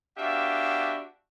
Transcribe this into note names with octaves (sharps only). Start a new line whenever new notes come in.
B3 D4 F#4 G4 E5 F5